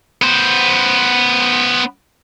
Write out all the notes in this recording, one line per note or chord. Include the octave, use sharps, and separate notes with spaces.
B3 C5